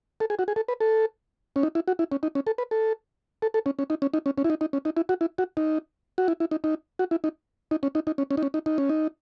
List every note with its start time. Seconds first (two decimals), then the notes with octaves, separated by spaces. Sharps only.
0.20 A4
0.30 G#4
0.39 F#4
0.48 G#4
0.56 A4
0.68 B4
0.80 A4
1.56 C#4
1.63 D#4
1.75 E4
1.88 F#4
1.99 E4
2.12 C#4
2.23 D#4
2.35 C#4
2.47 A4
2.58 B4
2.71 A4
3.42 A4
3.54 A4
3.66 C#4
3.79 C#4
3.90 D#4
4.02 C#4
4.14 D#4
4.26 C#4
4.38 C#4
4.44 E4
4.50 D#4
4.61 D#4
4.73 C#4
4.85 D#4
4.97 E4
5.09 F#4
5.21 E4
5.38 F#4
5.57 D#4
6.18 F#4
6.28 E4
6.40 E4
6.51 D#4
6.64 D#4
6.99 F#4
7.11 E4
7.24 D#4
7.71 D#4
7.83 C#4
7.95 D#4
8.07 D#4
8.18 C#4
8.31 C#4
8.37 D#4
8.43 C#4
8.54 D#4
8.66 D#4
8.78 C#4
8.89 D#4